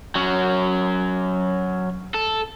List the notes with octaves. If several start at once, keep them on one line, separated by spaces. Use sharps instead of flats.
F#3 C#4
A4